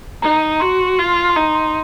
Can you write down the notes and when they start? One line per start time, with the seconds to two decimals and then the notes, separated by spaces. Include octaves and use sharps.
0.22 D#4 A#5
0.60 F#4 C6
0.98 F4
1.29 C6
1.36 D#4 A#5
1.55 C6